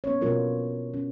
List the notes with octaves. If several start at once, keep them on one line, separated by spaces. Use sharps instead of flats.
B3 C#4 C#5
B2 B3 D4 F4 F#4 A#4
C#4